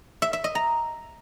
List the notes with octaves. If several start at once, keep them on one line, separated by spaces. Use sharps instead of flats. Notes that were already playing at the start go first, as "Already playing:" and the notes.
E5
E5
D#5
A#5